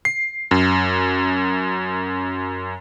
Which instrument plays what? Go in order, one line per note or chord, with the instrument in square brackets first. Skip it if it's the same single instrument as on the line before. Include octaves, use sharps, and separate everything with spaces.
[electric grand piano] C7
F#2